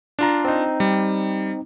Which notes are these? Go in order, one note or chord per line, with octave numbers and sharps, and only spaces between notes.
D4 F4 A#5
C4 D#4
G3